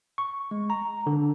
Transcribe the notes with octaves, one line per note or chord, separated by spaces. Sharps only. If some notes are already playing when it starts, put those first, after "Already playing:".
C#6
G#3
A#5
D3